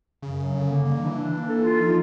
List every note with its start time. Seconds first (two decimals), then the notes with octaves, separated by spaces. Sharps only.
0.22 F#2 C#3
0.38 F#3
0.53 D3
0.70 A#3
0.84 C#3 G3
0.95 D#3
1.01 E3 D4
1.17 D4
1.31 A#3
1.48 A4
1.63 F4
1.79 F3 D#4